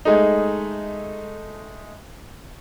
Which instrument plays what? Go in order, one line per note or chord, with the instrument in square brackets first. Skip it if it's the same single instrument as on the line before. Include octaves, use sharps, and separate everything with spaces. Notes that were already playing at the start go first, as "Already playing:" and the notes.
[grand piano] G#3 A3 D#4